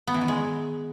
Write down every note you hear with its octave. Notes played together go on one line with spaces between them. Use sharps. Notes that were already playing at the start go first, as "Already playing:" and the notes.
B3
E3
D#3
G#3